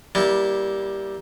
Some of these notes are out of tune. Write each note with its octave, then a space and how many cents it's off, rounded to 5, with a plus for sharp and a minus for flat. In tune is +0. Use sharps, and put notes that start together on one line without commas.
G3 +0 A#3 +20 E4 -10